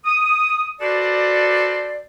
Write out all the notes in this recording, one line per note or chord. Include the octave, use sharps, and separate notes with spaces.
D#6
F#4 A4 B4 C5 D5